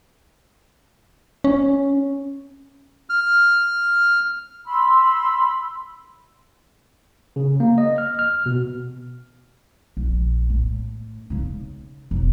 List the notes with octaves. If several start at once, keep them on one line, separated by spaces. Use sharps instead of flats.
C#4
F6
B5 C6 E6
C#3
A#3
D#5
F6
F6
B2
A#1
A2
C#3 D#4
E1